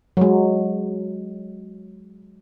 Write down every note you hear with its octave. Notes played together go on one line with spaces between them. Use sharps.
F#3 G#3